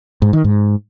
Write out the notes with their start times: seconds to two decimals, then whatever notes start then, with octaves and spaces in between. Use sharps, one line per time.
0.22 G#2
0.33 D#3
0.44 G#2